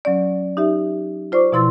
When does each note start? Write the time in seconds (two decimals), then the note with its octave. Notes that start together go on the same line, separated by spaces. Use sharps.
0.05 F#3 C#4 D5
0.57 D#4 G4 E5
1.32 F4 C5 D5 C#6 D6
1.52 B2 F3 E4 C6 E6 A6